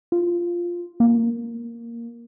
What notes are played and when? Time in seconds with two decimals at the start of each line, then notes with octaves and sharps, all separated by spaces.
0.12 F4
1.00 A#3